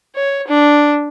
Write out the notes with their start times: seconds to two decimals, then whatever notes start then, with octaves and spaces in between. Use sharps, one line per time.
0.15 C#5
0.48 D4